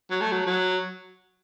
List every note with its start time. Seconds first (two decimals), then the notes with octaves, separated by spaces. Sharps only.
0.10 F#3
0.21 A3
0.32 F#3
0.46 F#3